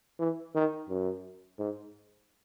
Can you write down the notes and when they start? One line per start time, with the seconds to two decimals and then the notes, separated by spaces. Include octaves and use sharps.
0.19 E3
0.55 D#3
0.89 F#2
1.59 G#2